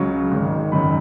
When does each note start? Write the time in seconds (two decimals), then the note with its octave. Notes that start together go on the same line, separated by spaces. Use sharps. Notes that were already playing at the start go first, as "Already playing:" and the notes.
Already playing: C#2 C#3 F#3 C#6
0.31 G#1 G#2 D#3
0.72 G#1 F#2 D#3 F#3 B5